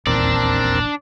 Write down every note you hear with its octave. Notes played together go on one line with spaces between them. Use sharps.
D#1 A#1 E2 C4 D4 A#4 D5 E6